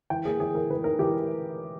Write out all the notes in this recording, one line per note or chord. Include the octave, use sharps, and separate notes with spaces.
E3 G5
A#3 G#4
E3 G#4
E3 A#4
E3 B4
D#4 A#4
E3 G4